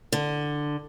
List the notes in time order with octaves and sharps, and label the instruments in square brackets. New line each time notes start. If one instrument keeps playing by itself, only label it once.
[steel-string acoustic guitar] D3